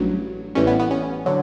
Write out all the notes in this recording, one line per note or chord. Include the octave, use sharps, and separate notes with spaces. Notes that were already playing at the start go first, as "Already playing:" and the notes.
Already playing: A1 G2 F#3
A1 A2 E3 G3 C#4
B3
B3
C#4
D3 F#3